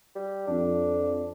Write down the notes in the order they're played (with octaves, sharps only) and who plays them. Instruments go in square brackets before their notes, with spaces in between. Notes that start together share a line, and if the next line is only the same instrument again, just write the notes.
[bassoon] G3
[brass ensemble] F2 [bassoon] D4